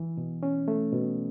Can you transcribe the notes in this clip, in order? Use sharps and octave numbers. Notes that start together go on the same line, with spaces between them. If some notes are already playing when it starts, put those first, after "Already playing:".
Already playing: E3
B2
C#4
A3
B2